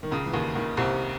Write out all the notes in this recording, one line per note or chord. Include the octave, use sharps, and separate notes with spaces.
D#3
C#2 C#3
E3
D#2 D#3
D#2 D#3
C2 C3